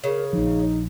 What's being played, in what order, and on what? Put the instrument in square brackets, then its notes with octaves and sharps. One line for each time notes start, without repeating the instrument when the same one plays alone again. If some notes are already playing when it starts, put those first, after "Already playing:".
[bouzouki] C#3 [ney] A#4
[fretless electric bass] A#1 F3 [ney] D#4